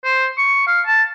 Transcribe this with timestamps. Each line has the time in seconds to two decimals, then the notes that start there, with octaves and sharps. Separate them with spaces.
0.04 C5
0.38 C#6
0.67 F5
0.86 A5